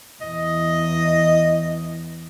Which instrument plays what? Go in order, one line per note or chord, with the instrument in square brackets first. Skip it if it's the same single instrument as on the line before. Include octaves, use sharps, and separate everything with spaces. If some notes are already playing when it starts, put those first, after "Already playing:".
[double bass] E2 [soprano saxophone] D#5